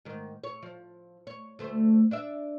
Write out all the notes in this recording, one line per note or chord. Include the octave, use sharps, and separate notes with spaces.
G#2 D#3
C#5
F3
C#5
D2 A3 C5
D4 D5 E5